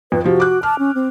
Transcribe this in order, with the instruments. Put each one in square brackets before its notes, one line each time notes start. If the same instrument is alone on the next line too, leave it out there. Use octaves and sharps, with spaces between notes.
[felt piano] F2 F3 [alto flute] B4
[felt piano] C3 F3 [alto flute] F#4
[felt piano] D6 F#6
[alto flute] A5 [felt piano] F6
[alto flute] C#4
C4